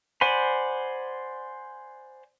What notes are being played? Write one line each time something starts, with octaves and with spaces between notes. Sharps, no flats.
C5 D5 F#5 G#5 B5